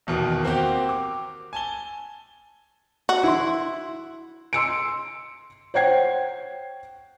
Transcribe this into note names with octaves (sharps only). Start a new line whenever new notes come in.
D#1 E2 B2 D#3
A#3 C4 F#4 G4
D6
G#5 A5 G7
F#4
E4 C6
C6 E6 C#7 D7
C5 C#5 F#5 G5 G#6 C7